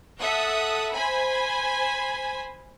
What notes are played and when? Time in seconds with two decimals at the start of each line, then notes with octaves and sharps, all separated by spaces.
0.20 A4 E5 F#5 D#6
0.93 C5 G#5 B5